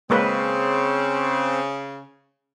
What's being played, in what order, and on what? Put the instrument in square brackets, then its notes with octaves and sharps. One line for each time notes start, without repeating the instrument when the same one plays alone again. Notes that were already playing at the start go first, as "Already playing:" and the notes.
[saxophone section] C#3 [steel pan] G#3 A#3 B4 [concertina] C4 C5